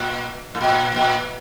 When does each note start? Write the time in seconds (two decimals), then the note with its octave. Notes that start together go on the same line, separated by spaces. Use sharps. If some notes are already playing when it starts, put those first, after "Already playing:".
Already playing: A#2
0.55 A2
0.61 A#2
0.96 A#2